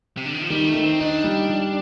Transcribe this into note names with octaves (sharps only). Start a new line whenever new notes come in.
C3
D3
D#3
F3
D#3 G3
A3
D#3
C4
D4 D#4
G3
G3